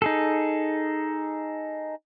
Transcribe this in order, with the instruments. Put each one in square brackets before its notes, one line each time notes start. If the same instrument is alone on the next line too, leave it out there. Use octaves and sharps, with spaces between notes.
[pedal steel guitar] D#4 G#4 A4